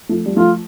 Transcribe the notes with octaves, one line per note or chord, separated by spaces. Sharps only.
F3 A3
G3
F3 A3 F4